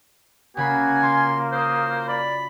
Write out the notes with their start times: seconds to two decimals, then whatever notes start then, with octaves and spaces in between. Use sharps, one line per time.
0.57 C#3 A#3 F#4 G#5 B5 C7
1.02 F4 F#4 C6
1.52 C5 D#6
2.08 D5 B5